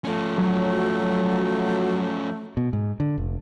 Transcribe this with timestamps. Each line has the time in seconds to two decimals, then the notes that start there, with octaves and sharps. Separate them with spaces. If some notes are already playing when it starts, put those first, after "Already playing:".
0.05 F3 A3 C#4
0.38 F#3
2.57 B2
2.73 G#2
3.00 D3
3.18 F1